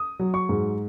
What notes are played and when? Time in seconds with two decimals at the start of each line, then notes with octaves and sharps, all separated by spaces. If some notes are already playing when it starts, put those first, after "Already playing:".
Already playing: D#6
0.19 F#3
0.34 C#6
0.49 G#2